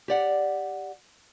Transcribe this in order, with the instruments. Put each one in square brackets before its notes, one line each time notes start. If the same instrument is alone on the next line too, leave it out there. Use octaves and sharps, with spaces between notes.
[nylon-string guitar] G4 D5 F#5